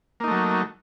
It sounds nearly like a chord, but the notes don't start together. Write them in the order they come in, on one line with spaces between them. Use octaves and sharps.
A#3 D#4 A3 F#3